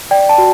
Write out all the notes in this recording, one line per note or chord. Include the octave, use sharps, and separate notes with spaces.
D5 G5
A5
F#4